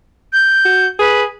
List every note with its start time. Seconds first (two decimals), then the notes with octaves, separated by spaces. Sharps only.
0.33 G6
0.65 F#4
0.99 G#4 B4